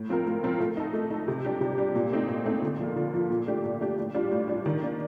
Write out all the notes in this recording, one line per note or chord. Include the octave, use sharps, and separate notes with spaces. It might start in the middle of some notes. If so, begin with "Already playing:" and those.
Already playing: A2
F3 C4 F4 A#4
A2
F3 C4 F4 A#4
A3
D#4 A4
A3
D#4 A4
C3
G3 D4 G4
C3
G3 D4 G4
A#2
A3 C4 D#4
A#2
A3 C4 D#4
D3
F3 A#3 F4
D3
F3 A#3 F4
A#2
A3 D4 G4
A#2
A3 D4 G4
A2
G3 D4 F4
A2
G3 D4 F4
D#3
A#3 D4